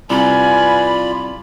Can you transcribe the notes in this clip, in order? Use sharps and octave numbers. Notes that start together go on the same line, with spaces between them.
C2 F4 B4 D5 F5 G#5 B5